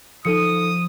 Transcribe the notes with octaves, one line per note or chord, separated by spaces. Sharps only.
F3 D#4 A4 D#6 C#7